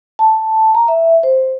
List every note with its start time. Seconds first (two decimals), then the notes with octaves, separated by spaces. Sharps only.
0.19 A5
0.75 A#5
0.88 E5
1.23 C5